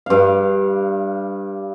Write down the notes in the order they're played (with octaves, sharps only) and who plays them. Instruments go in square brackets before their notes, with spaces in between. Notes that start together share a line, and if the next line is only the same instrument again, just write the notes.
[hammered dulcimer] G2 F5